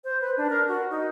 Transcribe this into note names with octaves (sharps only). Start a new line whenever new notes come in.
C5
B4
D4
A#4
F#4
D#4